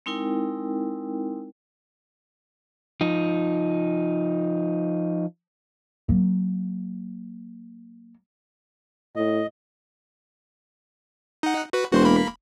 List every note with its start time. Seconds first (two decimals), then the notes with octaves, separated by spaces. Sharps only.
0.06 G#3 C4 D#4 E4 A#4 G5
3.01 F3 D#4
6.08 F#3 A#3
9.16 A2 D#5
11.43 D#4 F#5
11.73 F#4 B4
11.91 E1 F#4 C5 C6
12.05 A#3 B5